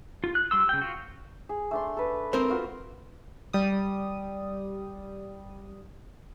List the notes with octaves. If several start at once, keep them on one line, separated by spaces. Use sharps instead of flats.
F4
F#6
G3 C6 E6
C#3 G5
F4 F#4
G#4
A3 D4 C6
A4 B4
C4 A#4 C5
F4 F#4
G3 D#6